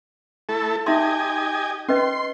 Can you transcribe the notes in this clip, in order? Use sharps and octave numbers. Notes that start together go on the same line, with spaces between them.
A3 E4 A4
D#4 G4 D#5 E5 G#5 C6
C#4 B4 D#5 C6